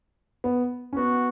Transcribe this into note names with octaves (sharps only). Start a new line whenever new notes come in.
B3
C#4
B3 F#4